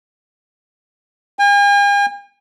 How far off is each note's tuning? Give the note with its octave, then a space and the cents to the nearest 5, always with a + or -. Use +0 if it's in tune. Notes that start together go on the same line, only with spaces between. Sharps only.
G#5 -45